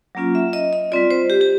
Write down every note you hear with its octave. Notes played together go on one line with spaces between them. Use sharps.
F#3 A#3 C#4 F4
E5
D#5
D#5
G3 C4 F4 D5
C5
G4
G4